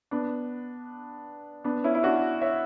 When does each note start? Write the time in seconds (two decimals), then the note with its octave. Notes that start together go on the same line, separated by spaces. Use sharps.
0.11 B3 D4
1.64 B3 D4
1.84 C#4 E4
1.95 E4
2.03 D4 F#4
2.41 C#5 E5